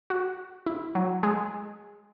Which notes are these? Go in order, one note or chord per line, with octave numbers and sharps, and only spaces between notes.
F#4
E4
F#3
G#3